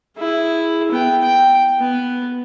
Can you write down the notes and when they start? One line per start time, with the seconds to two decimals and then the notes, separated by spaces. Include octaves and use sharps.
0.18 E4 G#4
0.92 B3 G5
1.22 G5
1.80 B3